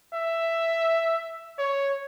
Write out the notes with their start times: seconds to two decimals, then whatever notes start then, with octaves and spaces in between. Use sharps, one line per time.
0.13 E5
1.59 C#5